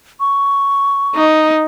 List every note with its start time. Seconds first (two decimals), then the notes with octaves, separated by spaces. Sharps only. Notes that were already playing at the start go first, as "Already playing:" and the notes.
0.20 C#6
1.15 D#4